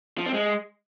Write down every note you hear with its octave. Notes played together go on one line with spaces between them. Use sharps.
F3
C4
G#3